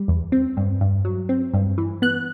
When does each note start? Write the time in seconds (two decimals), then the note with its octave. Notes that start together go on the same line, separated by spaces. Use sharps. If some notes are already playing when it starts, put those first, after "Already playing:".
Already playing: G3
0.08 E2
0.32 C4
0.57 G2
0.81 G2
1.05 F#3
1.29 C4
1.54 G2
1.78 E3
2.02 B3 F#6